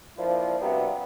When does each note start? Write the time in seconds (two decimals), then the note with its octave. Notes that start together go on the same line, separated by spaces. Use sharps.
0.17 F3 A#3 D4 E4
0.60 G2 C3 F#3 B3